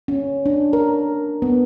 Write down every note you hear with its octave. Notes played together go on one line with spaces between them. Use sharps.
C#4
D4
A#4
B3